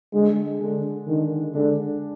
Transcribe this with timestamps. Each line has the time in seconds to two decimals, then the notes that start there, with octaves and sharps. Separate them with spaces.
0.13 D3 G#3
0.60 D3 G#3 D4
1.07 D3 D#3
1.54 D3 G#3 D4